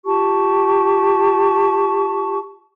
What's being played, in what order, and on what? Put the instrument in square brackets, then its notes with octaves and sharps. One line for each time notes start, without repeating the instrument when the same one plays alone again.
[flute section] F4 G4 A5 C#6